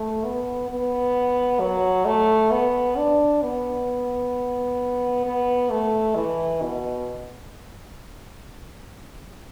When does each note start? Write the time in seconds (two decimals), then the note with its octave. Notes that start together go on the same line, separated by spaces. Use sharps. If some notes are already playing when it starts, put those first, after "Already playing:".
Already playing: A3
0.24 B3
0.69 B3
1.60 F#3
2.05 A3
2.51 B3
2.97 D4
3.42 B3
5.25 B3
5.70 A3
6.15 E3
6.61 B2